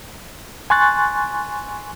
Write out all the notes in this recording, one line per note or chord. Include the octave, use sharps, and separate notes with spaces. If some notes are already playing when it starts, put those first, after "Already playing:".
G#5 C6 C#6 F#6 A6